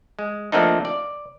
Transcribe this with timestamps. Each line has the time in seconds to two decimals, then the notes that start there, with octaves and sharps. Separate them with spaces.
0.19 G#3
0.52 F3 A3 A#3 C4 D4 D#4
0.85 D5